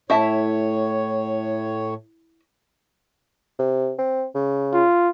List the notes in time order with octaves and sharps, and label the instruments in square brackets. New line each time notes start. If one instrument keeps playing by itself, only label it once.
[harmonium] A2 C#5 [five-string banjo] E4 E5 A5
[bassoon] C3
C4
C#3
[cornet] F4